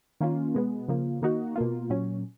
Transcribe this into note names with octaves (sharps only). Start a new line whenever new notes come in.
D#3 A#3 C#4 F4
B2 G#3 B3
C#3 F3 A#3
D#3 A#3 D#4 F#4
B2 A#3 F4
A#2 F#3 C#4